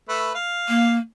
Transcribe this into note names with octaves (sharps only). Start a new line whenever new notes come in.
A3 B4
F5
A#3